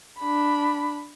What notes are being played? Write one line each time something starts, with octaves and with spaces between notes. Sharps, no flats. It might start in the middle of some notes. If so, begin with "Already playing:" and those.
D4 B5